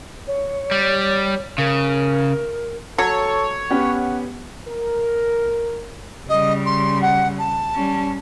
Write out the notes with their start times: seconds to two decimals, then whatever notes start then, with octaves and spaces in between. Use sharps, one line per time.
0.27 C#5
0.71 G3
1.58 C#3 A#4
2.98 F#3 A4 C#5
3.71 B3 C#4 G4 F#5
4.67 A#4
6.29 C#3 G3 D#5
6.65 C6
7.01 F#5
7.38 A5
7.74 G3 C#4